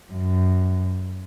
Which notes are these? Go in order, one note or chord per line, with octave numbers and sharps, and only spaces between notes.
F#2